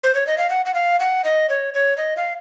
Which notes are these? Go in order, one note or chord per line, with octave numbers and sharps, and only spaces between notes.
C5
C#5
D#5
F5
F#5
F#5
F5
F#5
D#5
C#5
C#5
D#5
F5